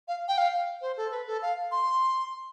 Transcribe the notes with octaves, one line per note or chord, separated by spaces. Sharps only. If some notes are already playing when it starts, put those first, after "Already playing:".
F5
G5
F5
C5
A4
B4
A4
F5
C6